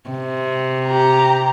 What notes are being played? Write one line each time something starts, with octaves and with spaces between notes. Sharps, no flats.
C3
G4 A#5